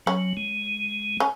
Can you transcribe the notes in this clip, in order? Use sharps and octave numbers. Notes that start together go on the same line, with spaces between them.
F#3 C#4
G#3
C#4